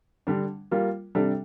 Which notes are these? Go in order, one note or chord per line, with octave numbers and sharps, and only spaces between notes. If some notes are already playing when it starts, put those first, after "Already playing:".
D3 G3 D4
G3 A#3 F4
C3 G3 D4 A4